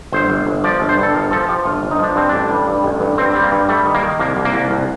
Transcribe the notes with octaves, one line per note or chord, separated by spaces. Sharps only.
G1 C5
G1
G1
F3 D5
G1
C5
G2
A4
G1 A#4
F3 A4
F3 G4
G1 F4
G1
D#4
F3 D4
G2 C4
A1 D4
G3
G2
A1
G2
G2 C4
G3 C4
A#3
G2
G3 A3
D#3
A#3
D#3
C2 A#3
C2
A#3
C2
C2